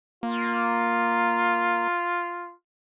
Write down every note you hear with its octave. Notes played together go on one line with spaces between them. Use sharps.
A#3 F4